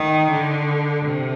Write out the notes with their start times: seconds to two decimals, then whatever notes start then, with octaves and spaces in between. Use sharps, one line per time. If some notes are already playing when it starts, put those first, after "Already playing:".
Already playing: D#3
0.31 D3
1.05 C3